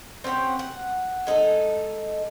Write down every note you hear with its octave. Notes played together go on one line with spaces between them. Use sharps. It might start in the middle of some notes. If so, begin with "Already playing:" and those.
C4 C#4 G4 F#5
F#5
G#3 D#4 E4 A4